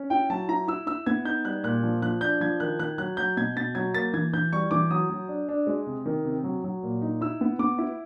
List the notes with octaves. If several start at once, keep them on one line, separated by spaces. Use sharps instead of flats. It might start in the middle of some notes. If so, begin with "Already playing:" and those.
Already playing: C#4
E4 G5
F#3 A5
E4 A#5
E4 E6
E4 E6
B3 G#6
D#4 G6
G3 F#6
A#2 F#6
F3
F3 F#6
D4 G6
F3 G#6
D#3 F#6
D#3 F#6
F#3 F#6
F#3 G6
B2 G#6
B2 A6
F#3 G#6
A#3 A6
E3 G#6
E3 G6
G3 C#6
E3 D6
F#3 D#6
F#3
D4
D4
G#3
C3
D#3
C3
F#3
F#3
A#2
D#4
E4 E6
B3
B3 D6
E4